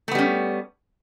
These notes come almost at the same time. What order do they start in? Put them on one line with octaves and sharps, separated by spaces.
A3 B3 G3 C#4